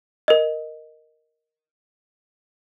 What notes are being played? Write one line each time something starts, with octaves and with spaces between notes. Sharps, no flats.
A#4 D#5